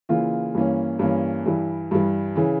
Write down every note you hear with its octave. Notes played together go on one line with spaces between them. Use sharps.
C#3 E3 A#3 F4
G2 E3 A#3 C#4
G2 E3 A#3 C#4
G2 E3 G3
G2 E3 G3
C#3 E3